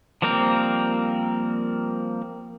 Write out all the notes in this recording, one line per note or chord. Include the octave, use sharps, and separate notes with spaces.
F3 G3 A#3 C4 A#4